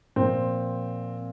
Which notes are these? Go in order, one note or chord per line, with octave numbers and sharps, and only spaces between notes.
A#2 F3 C4